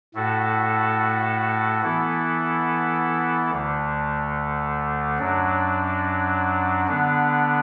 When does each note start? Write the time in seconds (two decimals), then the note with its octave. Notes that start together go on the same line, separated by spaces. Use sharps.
0.14 A2 A3 F#4 A4
1.83 E3 B3 E4 A4
3.50 D2 D3 A3
5.19 F#2 F#3 D4
6.87 D3 B3 D4